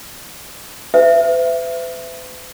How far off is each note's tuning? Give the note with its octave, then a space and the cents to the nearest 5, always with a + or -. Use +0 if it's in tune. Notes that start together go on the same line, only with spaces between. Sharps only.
B4 +45 E5 +20